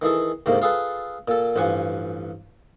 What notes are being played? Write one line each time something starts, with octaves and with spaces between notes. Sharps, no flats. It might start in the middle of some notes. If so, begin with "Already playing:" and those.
D#3 E3 G#4 A4
D2 G#2 C3 D#3 A#3
F4 G#4 A4 B4
A#2 A4
A1 G2 F3 F#5 G#5